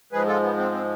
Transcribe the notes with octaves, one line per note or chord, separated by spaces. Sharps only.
G#2 F3 G#3 G#4 B4
F4 A4
B3
C4
C4